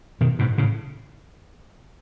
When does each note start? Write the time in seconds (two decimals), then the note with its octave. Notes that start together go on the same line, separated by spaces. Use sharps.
0.21 B2 D#3
0.39 G#2 B2
0.58 A2 C#3